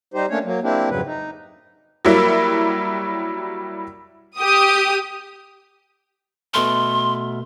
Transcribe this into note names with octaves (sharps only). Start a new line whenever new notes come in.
G3 D#4 G4 C5
A3 A#3 C#4 D4 C#5
F#3 A#3
A#3 C4 D4 E4 G4
F2 G#2 C#3 F#3 B4
D#4
F#3 G3 A#3 E4
G4 D#6
B2 A3 C6 F6